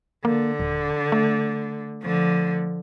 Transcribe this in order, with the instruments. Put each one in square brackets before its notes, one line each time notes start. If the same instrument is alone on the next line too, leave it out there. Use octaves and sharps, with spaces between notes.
[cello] D3 [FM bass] A#3
[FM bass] D#1
A3
[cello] D3 F3